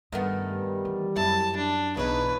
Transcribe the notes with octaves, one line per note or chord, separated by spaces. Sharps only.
G2 D#3 A3 B3
G3
E3
F#2 E4 A5
D4
B1 C#3 E3 D#4 B4